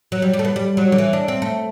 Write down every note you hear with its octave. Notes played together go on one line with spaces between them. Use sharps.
F#3
G3
G3
A3
B3
G3
F#3
D3
E3
D4
C4
A3